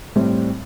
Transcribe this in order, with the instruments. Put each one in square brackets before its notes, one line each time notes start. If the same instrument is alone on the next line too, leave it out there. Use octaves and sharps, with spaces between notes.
[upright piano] A2 G3 C4